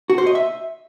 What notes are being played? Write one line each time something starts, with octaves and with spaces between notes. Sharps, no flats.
F#4
C5
D#5
E5